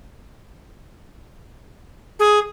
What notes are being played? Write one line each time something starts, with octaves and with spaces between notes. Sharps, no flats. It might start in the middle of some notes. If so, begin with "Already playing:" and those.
G#4